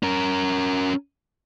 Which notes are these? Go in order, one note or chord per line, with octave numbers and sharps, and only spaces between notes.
C#4 A#4